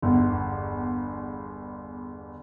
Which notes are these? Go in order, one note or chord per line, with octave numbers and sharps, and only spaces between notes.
G1 E2